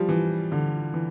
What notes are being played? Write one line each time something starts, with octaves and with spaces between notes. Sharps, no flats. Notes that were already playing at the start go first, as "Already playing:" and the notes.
Already playing: F3 G3
E3
D3
E3